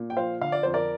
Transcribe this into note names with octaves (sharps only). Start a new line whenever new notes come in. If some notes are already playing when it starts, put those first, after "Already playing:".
Already playing: A#2
G5
F3 C5 F5
D3 F5
D5
F2 C5
A#4 D5